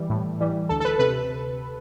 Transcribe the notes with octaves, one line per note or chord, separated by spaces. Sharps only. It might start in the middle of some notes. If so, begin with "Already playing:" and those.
Already playing: E3 G3
A2
E3 G3
D2 A4
A4
B4
C3 B4